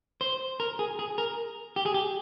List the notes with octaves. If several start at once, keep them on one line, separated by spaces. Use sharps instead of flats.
C5
A#4
G#4
G#4
A#4
G4
G#4
G4